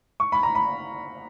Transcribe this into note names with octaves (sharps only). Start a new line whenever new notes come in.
C#6
B5
A#5
B5